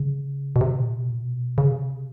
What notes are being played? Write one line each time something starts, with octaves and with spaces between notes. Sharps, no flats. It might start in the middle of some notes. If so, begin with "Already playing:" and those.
Already playing: C#3
B2
C3
A#2
B2
A#2
B2
C#3
C3